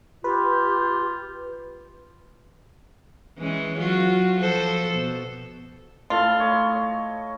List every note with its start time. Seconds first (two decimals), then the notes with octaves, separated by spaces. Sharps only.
0.24 F4 G4 B4
3.38 E3 G#3 C#4
3.79 F#3 F4 F#4
4.40 F3 A4 C5
4.93 B2
6.10 A2 F4 A4
6.40 C#5 D#5